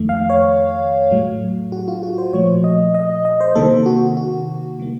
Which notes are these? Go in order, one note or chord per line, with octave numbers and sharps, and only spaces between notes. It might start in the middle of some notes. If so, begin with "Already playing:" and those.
Already playing: F2 D#3 A3
F5
C#5
A2 F#3 A3
F#4
F4
F#4
C5
A#2 F3 A3 C#5
D#5
D#5
D#5
C5
C3 D#3 A#3 A4
F#4
F#4
D#3 A#3